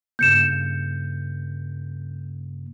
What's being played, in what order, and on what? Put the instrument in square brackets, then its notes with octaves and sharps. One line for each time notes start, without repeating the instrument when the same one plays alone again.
[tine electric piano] G2 C#3 A#3 [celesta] G6 C#7 E7